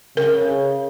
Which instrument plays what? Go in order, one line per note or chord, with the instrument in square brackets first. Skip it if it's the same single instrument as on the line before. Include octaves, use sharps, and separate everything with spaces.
[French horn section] C#3 [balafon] A#4